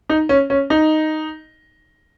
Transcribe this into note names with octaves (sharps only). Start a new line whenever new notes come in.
D#4
C#4
C#4
D#4